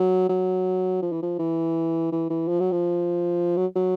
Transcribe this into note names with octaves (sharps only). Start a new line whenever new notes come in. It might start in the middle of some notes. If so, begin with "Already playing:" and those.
Already playing: F#3
F#3
F3
E3
F3
E3
E3
E3
F3
F#3
F3
F#3
F#3